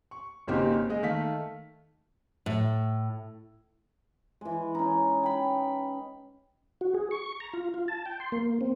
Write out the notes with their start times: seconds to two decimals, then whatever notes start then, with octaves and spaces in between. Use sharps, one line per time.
0.11 C#6
0.47 G#1 C#3 A#3 C4 D#4 G4
0.89 G#3 D#5
1.03 D#3 A3 F5 B6
2.46 A2
4.41 E3 G#3
4.75 C#4 D#4
5.23 G5 B5
6.81 F#4
6.94 G#4
7.11 C#6
7.40 A#5
7.53 F4
7.74 F4
7.88 A5
8.06 G5
8.20 C6
8.32 A#3
8.61 C4